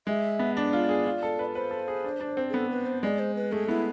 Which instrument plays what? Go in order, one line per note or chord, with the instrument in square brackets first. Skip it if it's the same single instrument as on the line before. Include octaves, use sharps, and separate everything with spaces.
[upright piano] G#3 [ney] E5
[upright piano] B3
[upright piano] D4 [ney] D5
[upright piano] F4
G#4
F4
A4
B4
[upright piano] B4 [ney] C5
[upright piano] A4
G#4
D4
D4
C4
[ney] G#4
[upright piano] B3 [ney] A4
[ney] B4
C5
[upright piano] G#3 [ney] D5
[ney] C5
B4
[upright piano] A3 [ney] G#4
[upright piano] B3 [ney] E4